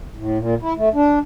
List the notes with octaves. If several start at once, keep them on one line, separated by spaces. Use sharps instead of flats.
A2
A#2
E4
A3
D4